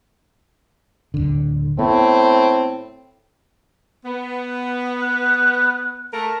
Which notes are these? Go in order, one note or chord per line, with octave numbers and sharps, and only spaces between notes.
D1 G1 D3
A2 B3 C4
B3
F#6
A3 A#4